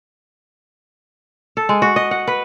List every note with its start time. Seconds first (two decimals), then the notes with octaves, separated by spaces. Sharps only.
1.57 A4
1.69 G#3
1.82 F#4
1.96 D#5
2.11 F#5
2.27 B4